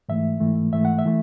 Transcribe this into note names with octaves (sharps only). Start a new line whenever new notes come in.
G#2 E3 A3 E5
G#2 E3 A3
G#2 E3 A3 E5
F#5
E5
E3 A3